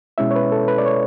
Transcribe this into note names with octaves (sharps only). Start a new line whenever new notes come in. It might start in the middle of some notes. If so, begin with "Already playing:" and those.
B2 G#3 C#4 E4 E5
C#5
B4
A4
B4
D5
C#5